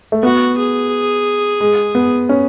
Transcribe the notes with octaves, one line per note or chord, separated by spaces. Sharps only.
A3
B3 F#4
G#4
G#3
B3
C#4